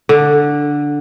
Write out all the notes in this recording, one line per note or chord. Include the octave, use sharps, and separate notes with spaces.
D3